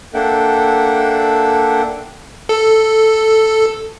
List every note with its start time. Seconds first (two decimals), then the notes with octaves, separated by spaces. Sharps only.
0.14 A#3 D4 A4 E5 F#5 G5
2.49 A4